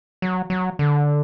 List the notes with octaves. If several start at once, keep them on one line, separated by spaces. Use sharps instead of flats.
F#3
F#3
D3